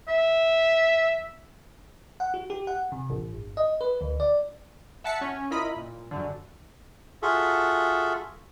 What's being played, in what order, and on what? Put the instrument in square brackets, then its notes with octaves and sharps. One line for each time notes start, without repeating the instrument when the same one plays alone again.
[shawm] E5
[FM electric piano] F#5
F#4
G4
F#5
C3
A1
G1
D#5
B4
D2
D5
[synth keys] E5 F#5 A5 B6 C#7
C#4
E4 F4 A#4 D#5 B5
A#2
F#2 D3
[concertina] F4 F#4 G#4 A4 E5